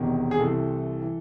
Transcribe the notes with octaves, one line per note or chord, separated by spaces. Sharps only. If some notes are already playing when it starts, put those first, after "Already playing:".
Already playing: E1 E2 C3 D#3
G#4
C2 C3 E3 A4
E3